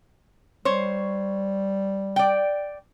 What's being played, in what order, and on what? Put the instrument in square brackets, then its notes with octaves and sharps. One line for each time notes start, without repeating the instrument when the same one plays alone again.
[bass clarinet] G3 [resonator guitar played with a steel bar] C5 C#5
[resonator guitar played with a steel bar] D5 G5